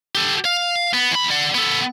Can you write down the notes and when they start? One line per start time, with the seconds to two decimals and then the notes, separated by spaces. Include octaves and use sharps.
0.15 G4 A4
0.45 F5
0.93 B3
1.11 E2 B5
1.31 D5 F#5
1.55 B3 A4